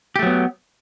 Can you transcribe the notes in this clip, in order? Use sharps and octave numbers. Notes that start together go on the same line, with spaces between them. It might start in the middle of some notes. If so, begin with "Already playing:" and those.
F#3 A3 B3 G4